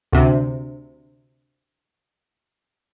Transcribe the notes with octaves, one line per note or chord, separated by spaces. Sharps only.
D2 C3